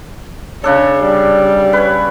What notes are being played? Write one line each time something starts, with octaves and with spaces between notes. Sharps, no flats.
C#3 D4 A4 C#5
G3
B4 C#5